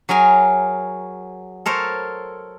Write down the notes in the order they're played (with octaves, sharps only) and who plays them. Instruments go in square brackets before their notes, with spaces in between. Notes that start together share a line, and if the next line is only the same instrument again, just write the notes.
[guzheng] F#3 G#4 A#4 G#5
A4 A#4 C5 C#5